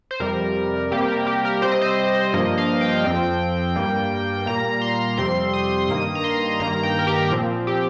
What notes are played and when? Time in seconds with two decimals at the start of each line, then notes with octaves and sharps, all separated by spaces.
0.11 C5
0.20 F2 C3 G3 A#4
0.91 C3 G3 A#3 G4
1.08 A#4
1.27 G4
1.45 A#4
1.62 C3 G3 C4 C5
1.72 D#5
1.81 C5
2.33 G2 F3 A#3 D#5
2.58 F5
2.81 G5
3.04 F2 F3 C4
3.75 G2 G3 A#3
4.46 A#2 G3 A#3 A#5
4.82 C6
5.17 F2 C3 G3 C4 C6
5.53 D#6
5.89 G2 D#3 A#3 D#6
6.15 A#5
6.24 C6
6.60 G2 D#3 A#3 A#5
6.83 G5
6.99 A#4
7.07 G4
7.31 A#2 F3 C4
7.67 G4